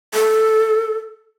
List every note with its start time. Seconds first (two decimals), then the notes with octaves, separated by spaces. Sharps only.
0.14 A4